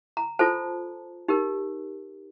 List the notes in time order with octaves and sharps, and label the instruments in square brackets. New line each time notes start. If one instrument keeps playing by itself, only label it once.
[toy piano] A#5
F4 A4 C5 A5
D#4 G4 A#4